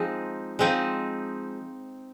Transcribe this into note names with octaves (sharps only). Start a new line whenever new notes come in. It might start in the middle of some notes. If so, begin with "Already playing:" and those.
Already playing: F3 G#3 C4 D#4
F3 G#3 C4 D#4